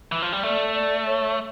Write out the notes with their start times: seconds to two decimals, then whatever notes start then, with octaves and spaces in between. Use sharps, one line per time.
0.12 E3
0.22 F3
0.32 G3
0.43 A3 D5
0.75 D5
1.06 C#5